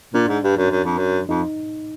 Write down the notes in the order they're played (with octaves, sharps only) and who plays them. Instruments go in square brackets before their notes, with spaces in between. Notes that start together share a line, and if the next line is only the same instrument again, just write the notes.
[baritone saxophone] A#2 [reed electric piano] D4
[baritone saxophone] G#2
G2
F#2
F#2
F2
F#2
[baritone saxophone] F2 [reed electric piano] D#4